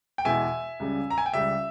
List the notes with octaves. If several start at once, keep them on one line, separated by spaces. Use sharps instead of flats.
G5
E2 B2 G#3 E5 G#5
C#2 C#3 G3
A#5
G#5
G5
C#2 C#3 G3 E5